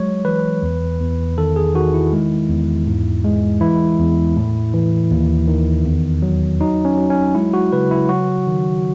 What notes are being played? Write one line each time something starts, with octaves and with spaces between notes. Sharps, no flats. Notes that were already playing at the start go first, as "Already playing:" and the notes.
Already playing: F#3 G#3 C#5
E3 B4
E2
E2
D#3 A4
G#4
D#3 F#4
E4
G#3
E2
G#2
G#3
E3 E4
E2
A2
E3
D#2
D#3
E2
F#3
F#3 D#4
C#4
F#3
C#4
G#3 E4
F#4
C#3 B4
E4
F#3 F#4
D#3